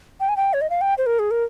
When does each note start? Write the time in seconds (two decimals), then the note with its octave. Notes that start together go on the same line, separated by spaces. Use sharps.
0.20 G5
0.29 G#5
0.37 G5
0.53 C#5
0.61 D#5
0.70 F5
0.81 G5
0.98 C5
1.06 A#4
1.19 G#4
1.31 A#4